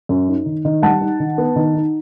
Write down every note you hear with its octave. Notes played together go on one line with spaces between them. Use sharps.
F#2
D#4
D#3
D#3
G3 F#5 A5
D#4
D#3
B3
D#3
D#4